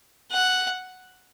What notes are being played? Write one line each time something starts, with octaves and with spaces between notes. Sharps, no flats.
F#5